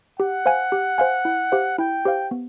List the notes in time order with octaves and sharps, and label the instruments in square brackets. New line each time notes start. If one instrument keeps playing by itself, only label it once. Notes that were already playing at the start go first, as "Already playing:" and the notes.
[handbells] G4 [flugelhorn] F#5
[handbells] C5 F5 G#5
G4
C5 F5 G#5
E4
G4 C5 F5
[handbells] E4 [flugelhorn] G5
[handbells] G4 C5 F5
B3